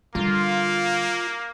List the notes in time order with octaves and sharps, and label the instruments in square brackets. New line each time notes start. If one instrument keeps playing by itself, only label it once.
[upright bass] D3 G3 [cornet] A#3 [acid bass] F4